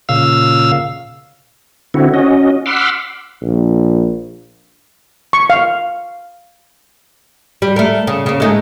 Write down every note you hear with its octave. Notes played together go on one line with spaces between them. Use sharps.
A#2 C#3 F5 E6
D3 C4 E4 F#4
C#4 F#4 D#5
F#5 B5 C6 D6 E6 F6
A#1
C#6
F5
G3
A3 A#4
C#3
C#3 A#3
G#3 A3 D#4